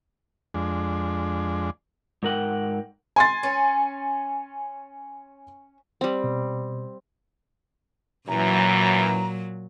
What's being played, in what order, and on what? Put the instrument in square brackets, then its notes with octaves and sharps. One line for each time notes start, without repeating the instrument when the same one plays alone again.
[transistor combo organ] F2 G#3 D4
[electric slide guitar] G#2 A#4 F#5 G5
[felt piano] G#5 C6 A6
[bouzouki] C#4
[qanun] G3 C4
[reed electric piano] B2
[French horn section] F#2 E3 [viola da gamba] A#2 F#3 [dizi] A#5